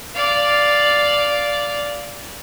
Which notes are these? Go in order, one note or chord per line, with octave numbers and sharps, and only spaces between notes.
D5 F5